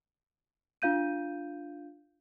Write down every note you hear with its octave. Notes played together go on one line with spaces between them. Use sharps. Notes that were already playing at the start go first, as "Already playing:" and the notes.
D4 F4 F5 G6 D#7